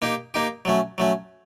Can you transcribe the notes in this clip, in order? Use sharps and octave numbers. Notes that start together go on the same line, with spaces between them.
A#3 D#4 G4
A#3 D#4 G4
F#3 A3 C#4
F#3 A3 C#4